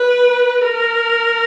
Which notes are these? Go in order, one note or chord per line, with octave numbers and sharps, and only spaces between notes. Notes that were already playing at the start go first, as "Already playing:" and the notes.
Already playing: B4
A#4